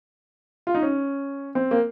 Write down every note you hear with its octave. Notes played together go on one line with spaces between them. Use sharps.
F4
D#4
C#4
C4
A#3